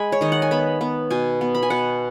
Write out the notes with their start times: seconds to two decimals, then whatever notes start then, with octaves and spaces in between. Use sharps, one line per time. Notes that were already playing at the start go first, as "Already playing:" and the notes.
Already playing: G#3 G#5 B5
0.12 C#5
0.21 D#3 D#5
0.32 F#5
0.42 G#5
0.51 B3 B5
0.81 B3
1.10 B2 G#5
1.41 B3
1.55 B5
1.62 G#5
1.70 B2 F#5